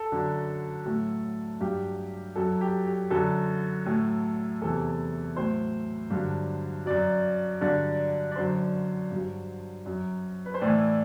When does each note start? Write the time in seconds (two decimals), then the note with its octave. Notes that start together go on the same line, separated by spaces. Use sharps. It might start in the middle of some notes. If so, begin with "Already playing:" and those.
Already playing: A4
0.12 F#2 D3 F#3
0.86 A2 F#3
1.61 G2 F#3 G4
2.36 F#2 F#3 A4
2.61 G4
2.87 G4
3.11 F#2 D3 F#3 A4
3.86 A2 F#3
4.62 E2 C3 E3 A4
5.36 A2 F#3 C5
6.11 G2 D3 F#3
6.86 F#2 F#3 D5
7.61 G2 D3 F#3 D5
8.31 D5
8.36 F#2 D3 F#3 C5
9.11 G2 F#3
9.86 F#2 F#3
10.46 B4
10.54 C5
10.61 A2 E3 D5